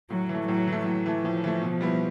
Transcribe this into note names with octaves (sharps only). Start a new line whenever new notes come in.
A2 F#3
E3
A3
A2 F#3
E3 A3
A2 F#3
E3 A3
A2 F3
E3 A3
B2
G3 B3 E4